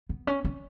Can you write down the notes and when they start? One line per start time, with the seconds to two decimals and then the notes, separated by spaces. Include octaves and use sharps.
0.09 B3
0.27 C#4
0.45 C#4